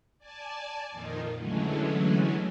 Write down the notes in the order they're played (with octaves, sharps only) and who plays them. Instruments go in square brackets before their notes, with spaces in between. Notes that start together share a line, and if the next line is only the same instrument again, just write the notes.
[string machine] D5 G#5 A5
F2 A#2 D#3 D#4 F4
D3 E3 F#3 G#3 A3 C#4